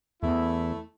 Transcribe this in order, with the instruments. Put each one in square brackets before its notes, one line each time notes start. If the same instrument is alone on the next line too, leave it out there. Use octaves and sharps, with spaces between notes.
[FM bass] E2 [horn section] A3 E4